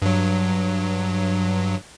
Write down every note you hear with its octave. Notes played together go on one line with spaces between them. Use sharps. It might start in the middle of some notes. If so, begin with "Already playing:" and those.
G2 F#3